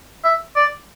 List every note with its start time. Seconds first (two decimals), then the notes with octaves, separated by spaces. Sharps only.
0.24 E5
0.56 D5